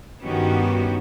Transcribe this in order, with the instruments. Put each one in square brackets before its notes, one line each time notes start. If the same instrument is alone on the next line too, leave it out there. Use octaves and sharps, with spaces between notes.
[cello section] G2 D#3 B3 C#4 F#4 G4